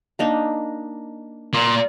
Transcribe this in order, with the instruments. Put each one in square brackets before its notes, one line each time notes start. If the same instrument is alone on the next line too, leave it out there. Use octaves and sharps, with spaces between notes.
[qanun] A#3 D4 D#4
[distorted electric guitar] A#2